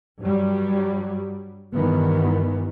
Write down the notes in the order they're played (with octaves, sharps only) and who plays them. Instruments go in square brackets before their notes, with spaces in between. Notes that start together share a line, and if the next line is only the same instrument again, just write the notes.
[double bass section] G2 F#3 G3
G2 D#3 E3 B3